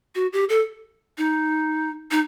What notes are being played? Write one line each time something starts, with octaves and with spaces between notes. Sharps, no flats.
F#4
G4
A4
D#4
D#4